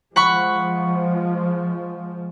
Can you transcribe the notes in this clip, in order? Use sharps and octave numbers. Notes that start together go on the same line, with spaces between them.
F3 G#3 F#5 B5 C#6